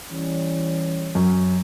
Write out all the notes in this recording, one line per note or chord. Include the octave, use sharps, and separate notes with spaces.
E3 G3 C#4
F#2